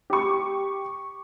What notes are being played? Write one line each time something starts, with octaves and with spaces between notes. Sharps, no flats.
G4 C#6